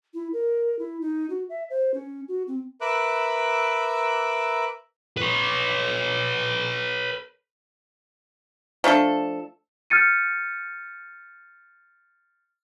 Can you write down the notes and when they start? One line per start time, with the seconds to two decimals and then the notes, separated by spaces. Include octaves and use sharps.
0.14 E4
0.33 A#4
0.79 E4
1.01 D#4
1.30 F#4
1.49 E5
1.70 C5
1.94 C#4
2.28 F#4
2.48 C4
2.81 A#4 B4 E5 D6 E6 F#6
5.17 B4 C#5
8.84 F3 A3 D4 A4
9.90 F6 G6 A6 C#7 D#7